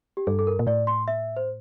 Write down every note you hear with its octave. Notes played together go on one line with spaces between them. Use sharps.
G4
G2 A4
A4
A#4
A#2
A2 D5
C6
E5
C5